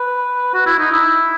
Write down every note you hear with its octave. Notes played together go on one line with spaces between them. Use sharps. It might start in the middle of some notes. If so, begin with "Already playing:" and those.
Already playing: B4
F#4
E4
D#4
E4